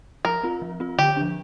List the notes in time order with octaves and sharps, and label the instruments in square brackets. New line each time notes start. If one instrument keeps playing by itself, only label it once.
[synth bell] F3 [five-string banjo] A#4
[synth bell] C4 F4
F3
C4 F4
[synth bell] D3 [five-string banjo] G4
[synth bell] F3 D4